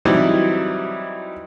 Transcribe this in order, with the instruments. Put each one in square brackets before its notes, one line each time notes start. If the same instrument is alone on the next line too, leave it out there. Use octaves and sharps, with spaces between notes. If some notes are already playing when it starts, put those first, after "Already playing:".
[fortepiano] E3 F#3 G3 C4 D#4 E4